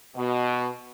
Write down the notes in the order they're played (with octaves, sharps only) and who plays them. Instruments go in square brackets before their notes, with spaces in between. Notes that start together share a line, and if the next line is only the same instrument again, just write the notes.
[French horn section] B2